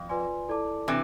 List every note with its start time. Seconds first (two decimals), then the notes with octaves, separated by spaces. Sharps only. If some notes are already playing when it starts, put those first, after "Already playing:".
Already playing: F2
0.09 F4 B4 D5 G#5 C6
0.49 E4 A4 D5 A5 D6
0.88 C3 E3 D4